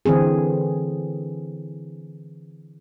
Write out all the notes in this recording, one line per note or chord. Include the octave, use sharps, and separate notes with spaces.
D3 E3 C4 G#4